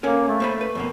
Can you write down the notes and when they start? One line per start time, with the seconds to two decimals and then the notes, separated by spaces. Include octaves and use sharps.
0.03 A#3 C#4 A4 A#4
0.27 A3
0.40 A#3 C5 B5
0.61 B4
0.75 F2 B2 A#3